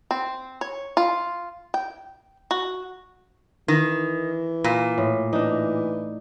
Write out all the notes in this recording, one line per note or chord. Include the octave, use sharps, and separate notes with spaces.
C4
C#5
F4
G5
F#4
D#3 E3
A#2
A2
E3 D4 D#4